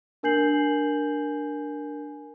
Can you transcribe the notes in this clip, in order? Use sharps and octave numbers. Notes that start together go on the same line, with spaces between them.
D4 A#4 G#5 G6 C7 F#7